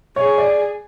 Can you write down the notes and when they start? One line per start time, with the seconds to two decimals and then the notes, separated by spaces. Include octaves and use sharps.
0.16 G#4 C#5
0.38 D5